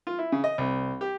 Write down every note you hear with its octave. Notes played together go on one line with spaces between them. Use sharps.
F4
E4
C#3
D#5
C2
G4